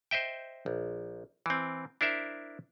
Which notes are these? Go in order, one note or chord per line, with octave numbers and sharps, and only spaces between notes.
C5 D#5 E5 G5
A#1
E3 C4
D4 E4 A#4 C5 E5